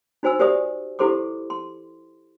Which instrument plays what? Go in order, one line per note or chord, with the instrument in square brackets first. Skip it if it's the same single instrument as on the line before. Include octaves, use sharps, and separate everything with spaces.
[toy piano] D#4 F#4 C5 G#5 E6
G4 A#4 C5 D5 E5 D#6
E4 G4 A4 C5 C6 D6
C6